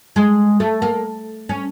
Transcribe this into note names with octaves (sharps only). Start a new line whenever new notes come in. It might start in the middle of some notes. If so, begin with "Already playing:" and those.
G#3
A3
A#3
C#4